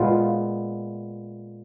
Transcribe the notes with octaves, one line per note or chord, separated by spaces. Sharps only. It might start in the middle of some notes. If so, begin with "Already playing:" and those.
Already playing: A#2 G#3 B3 F4